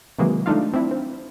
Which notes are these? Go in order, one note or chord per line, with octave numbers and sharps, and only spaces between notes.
C3 D#3 E3 F#3 G#3 A#3
G#3 A3 D4 D#4 F4 F5
C4 D4 E4
C4